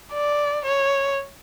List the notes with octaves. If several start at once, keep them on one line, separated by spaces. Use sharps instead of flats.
D5
C#5